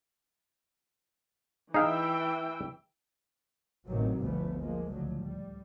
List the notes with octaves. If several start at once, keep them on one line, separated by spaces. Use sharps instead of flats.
E3 D#4 G#4 E5 F5 G5
A1 C3 D#3 F#3
G1 D2 B2 F3 A3 B3
F3 G#3 A#3
C#2 A2 D3 F3 F#3
G3